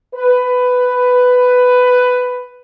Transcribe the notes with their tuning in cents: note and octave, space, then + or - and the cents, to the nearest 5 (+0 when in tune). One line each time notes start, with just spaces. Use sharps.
B4 +10